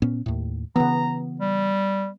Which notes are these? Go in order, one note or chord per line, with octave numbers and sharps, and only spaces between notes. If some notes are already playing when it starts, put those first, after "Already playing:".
A#2 B3 C#4
D#2 A2
C#3 E3 B3 A#5
G3